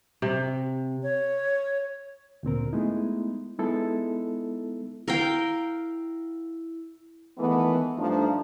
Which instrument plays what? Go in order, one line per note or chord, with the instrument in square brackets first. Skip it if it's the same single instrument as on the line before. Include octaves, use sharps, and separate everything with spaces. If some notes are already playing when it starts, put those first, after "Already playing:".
[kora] C3
[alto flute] C#5
[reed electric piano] D2 A#2 C4 A#4
G#3 A3 B3 D#4 E4
G#3 B3 D#4 E4 A4
[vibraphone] E4 [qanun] A#4 F5 G5
[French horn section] D#3 E3 G#3 A3 B3
G2 F3 A3 D4 D#4